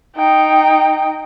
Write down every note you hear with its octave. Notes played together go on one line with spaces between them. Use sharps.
D#4 G5